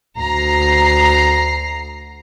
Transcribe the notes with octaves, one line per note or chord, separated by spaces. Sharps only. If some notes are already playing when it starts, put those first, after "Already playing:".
D2 A#5 C7